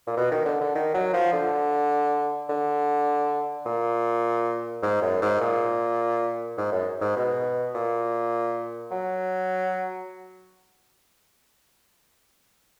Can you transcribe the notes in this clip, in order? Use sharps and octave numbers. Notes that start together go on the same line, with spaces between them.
A#2
B2
D#3
D3
D3
D#3
F#3
F3
D3
D3
A#2
G#2
F#2
G#2
A#2
G#2
F#2
G#2
B2
A#2
F#3